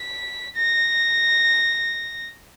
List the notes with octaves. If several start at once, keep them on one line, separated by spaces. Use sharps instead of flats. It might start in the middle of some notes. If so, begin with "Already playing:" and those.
Already playing: B6
A#6